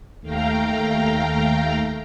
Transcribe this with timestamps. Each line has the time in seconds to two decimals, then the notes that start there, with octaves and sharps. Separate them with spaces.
0.21 D#2 A3 F5 G5 A#5